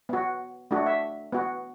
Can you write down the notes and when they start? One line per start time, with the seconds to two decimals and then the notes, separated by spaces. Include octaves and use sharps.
0.09 B3 F#4
0.71 A3 D4 F#4
0.86 E5
1.32 B3 F#4